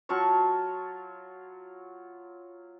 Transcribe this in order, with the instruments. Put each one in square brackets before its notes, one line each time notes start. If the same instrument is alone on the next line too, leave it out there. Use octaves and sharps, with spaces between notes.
[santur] F#3 F4 A5 C#6